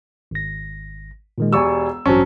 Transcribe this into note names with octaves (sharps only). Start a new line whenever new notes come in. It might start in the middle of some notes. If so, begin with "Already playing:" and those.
G#1 A#6
A#2 D#3 G#3
E1 G4 D5 G#5 C#6 E6
A1 G2 F#3 C4 C#4 A5